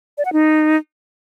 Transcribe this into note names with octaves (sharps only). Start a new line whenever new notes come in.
D5
F#5
D#4